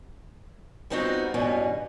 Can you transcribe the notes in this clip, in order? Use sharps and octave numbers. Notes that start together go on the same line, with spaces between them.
G3 B3 C4 D#4 F4 F#4
G2 B2 E3 C#4